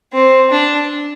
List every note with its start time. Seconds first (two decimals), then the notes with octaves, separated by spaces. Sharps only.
0.13 C4
0.51 D4